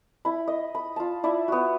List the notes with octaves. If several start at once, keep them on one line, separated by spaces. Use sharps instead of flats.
E4 B5
D#5
B5
F4 A5
E4 D5 E5 B5
B3 F#4